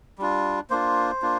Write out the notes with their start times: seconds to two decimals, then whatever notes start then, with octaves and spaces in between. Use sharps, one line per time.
0.18 G3 D4 F4
0.70 A#3 D4 F4 C5
1.22 A#3 D4 F4